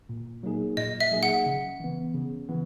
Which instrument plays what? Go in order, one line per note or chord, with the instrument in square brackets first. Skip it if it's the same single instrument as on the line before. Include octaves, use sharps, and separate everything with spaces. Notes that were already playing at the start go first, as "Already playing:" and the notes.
[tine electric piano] A#2
F#3 A#3 D#4 G#4
[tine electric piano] A#2 [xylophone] D#5
[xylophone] E5
[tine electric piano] F#3 A#3 D#4 G#4
[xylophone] F#5
[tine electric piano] C#3
E3 B3
C#3
E3 B3